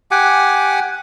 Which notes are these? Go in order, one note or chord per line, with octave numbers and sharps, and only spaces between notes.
G4 F#5 G#5 D6